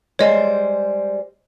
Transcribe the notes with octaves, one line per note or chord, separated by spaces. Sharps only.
G3 G#3 C5 C#5 D#5 G#5